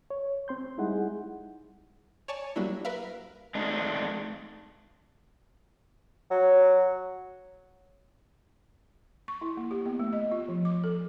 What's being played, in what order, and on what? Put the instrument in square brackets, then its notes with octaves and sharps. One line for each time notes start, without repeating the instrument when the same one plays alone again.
[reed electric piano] C#5
C4 C6 G6
G3 G#3 D#4 E4 G#4 F#5
[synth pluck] C#5 D5 G#5 A5 C#6
F#3 G3 A#3 D4 E4
A#4 B4 E5 F5
[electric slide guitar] G#3 A3 C4 D4 D#4
[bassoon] F#3
[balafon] C#6
E4
A#3
G4
B3
A3
D#5
F4
F3
D6
A4